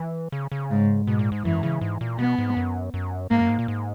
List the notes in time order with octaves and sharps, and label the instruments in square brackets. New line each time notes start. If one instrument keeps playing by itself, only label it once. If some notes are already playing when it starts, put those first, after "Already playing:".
Already playing: [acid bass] E3
C#3
C#3
[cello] G#2
[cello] G#2 [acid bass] B2
[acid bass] A#2
G#2
[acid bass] F#2 [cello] E3
[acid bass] C#3
G#2
A#2
[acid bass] B2 [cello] B3
[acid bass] G#2
F#2
F#2
[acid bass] G#2 [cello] A#3
[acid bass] F#2
G#2
A#2
G#2